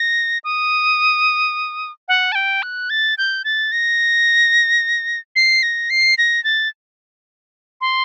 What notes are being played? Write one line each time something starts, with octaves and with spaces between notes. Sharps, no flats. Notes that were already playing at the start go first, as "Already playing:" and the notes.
Already playing: A#6
D#6
F#5
A5
G5
F#6
A6
G6
A6
A#6
C7
A#6
C7
A#6
A6
C6